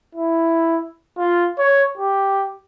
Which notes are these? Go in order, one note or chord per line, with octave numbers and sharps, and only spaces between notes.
E4
F4
C#5
G4